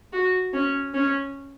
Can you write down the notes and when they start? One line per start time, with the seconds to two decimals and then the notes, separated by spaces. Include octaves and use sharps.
0.13 F#4
0.54 C#4
0.94 C#4